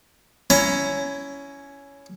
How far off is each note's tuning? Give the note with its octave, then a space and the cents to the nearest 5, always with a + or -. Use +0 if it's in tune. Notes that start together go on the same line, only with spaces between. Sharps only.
C#4 +15 E4 +10 A#5 +10